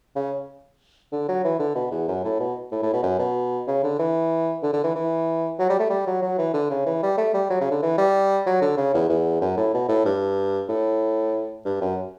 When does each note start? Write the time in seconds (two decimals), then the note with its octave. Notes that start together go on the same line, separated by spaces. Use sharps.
0.16 C#3
1.12 D3
1.29 F#3
1.44 E3
1.59 D3
1.76 B2
1.91 E2
2.08 F#2
2.24 A2
2.40 B2
2.72 A2
2.83 A2
2.93 B2
3.03 F#2
3.19 B2
3.67 C#3
3.83 D3
3.99 E3
4.63 D3
4.73 D3
4.84 E3
4.95 E3
5.59 F#3
5.70 G3
5.80 A3
5.90 G3
6.07 F#3
6.22 F#3
6.38 E3
6.54 D3
6.70 C#3
6.86 E3
7.03 G3
7.18 A3
7.34 G3
7.50 F#3
7.61 C#3
7.71 D3
7.82 E3
7.98 G3
8.46 F#3
8.61 D3
8.77 C#3
8.94 E2
9.09 E2
9.41 F#2
9.57 A2
9.74 B2
9.89 A2
10.05 G2
10.69 A2
11.65 G2
11.81 F#2